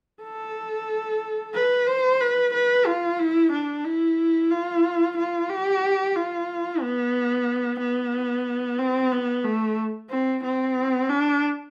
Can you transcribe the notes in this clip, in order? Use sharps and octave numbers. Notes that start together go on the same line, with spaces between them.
A4
B4
C5
B4
B4
F4
E4
D4
E4
F4
F4
G4
F4
B3
B3
C4
B3
A3
C4
C4
D4